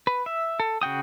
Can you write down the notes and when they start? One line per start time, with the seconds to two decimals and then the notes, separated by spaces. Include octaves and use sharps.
0.07 B4
0.26 E5
0.60 A4
0.82 C#3 F#4 G5 D#6